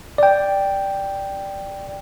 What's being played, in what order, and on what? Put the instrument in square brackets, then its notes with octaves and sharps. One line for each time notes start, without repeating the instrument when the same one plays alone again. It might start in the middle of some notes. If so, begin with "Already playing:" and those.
[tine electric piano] D5 G5